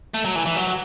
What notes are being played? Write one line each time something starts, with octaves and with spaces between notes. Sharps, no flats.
A3
F#3
E3
E3
F#3